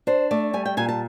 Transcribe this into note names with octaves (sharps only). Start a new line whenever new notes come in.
D4 C5
A3 D5
G3 G#5
G5
A#2 G#5
A5